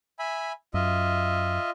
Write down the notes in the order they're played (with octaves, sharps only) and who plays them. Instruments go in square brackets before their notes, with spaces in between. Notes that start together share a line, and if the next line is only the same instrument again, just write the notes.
[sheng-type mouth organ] E5 G#5 B5
[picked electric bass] F#2 [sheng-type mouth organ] F4 D#5 E5